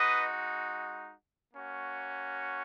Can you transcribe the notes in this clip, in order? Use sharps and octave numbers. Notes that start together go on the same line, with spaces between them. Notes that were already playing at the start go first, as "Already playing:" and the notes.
Already playing: G#3 D#4 F#4 B4 D#5
A#3 C#4 F#4